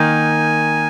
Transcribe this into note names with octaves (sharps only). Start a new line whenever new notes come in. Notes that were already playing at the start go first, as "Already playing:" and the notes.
Already playing: D#3 A#3 D#4 G#5